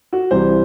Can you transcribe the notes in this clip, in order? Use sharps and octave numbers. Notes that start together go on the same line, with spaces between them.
F#4
C2 C3 E3 G3 C5